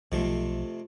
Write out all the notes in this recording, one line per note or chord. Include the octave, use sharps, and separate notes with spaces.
B1 F2 C3 F3 A3